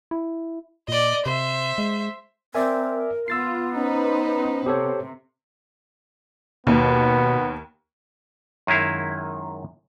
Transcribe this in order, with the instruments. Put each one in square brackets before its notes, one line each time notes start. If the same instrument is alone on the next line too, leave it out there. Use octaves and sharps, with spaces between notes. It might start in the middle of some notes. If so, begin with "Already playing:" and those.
[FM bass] E4
[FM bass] A#2 [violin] D5 D#5
[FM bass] C3 [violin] C5 E5
[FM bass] G#3
[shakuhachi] C4 [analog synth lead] A#4 [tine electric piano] D5 E5 G#5
[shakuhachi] B3 [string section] F4 [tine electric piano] E6 A6 C7
[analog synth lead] C#4 [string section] D#4 B4 C5
[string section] C3 [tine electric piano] G4 A4 C#5 [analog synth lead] C5
[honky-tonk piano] D#2 [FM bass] B2 [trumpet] B3
[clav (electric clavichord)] F#2 D#3 G#3 E4 F5